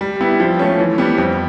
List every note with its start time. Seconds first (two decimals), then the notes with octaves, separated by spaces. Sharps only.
0.01 G3
0.21 B3 E4 G4
0.40 F3
0.59 A3 C#4
0.79 E3
0.98 G3 B3
1.18 F2